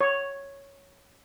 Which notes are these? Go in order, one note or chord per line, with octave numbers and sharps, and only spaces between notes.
C#5